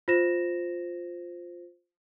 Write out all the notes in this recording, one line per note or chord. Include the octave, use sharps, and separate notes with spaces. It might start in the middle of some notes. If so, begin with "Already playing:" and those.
F4 C5 A#6 E7